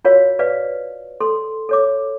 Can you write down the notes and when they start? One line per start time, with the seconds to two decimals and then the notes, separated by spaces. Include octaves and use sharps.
0.05 F4 F#4 A#4 C#5 D#5 F5
0.39 B4 D5 F5
1.20 A4 C6
1.69 A4 C#5 D6